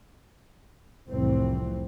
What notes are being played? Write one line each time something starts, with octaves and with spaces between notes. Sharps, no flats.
F1 C2 A2 E3 C4